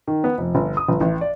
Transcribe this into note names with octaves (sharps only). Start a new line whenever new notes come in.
D#3
B3
F1
G1
D#6
G1
A1
D5